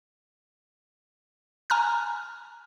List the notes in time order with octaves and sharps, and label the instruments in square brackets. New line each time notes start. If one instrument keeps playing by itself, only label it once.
[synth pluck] G#5 A#5 F6 F#6